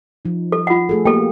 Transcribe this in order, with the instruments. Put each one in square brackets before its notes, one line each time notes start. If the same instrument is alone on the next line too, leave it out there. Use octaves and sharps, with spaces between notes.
[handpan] F3 D#4
[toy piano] A4
F4 F#5
[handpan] A3 G#4 A4
[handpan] A#3 B3 G4 [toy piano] A4 G5